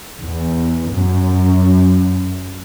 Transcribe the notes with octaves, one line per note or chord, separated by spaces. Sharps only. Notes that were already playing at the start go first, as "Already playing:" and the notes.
E2
F#2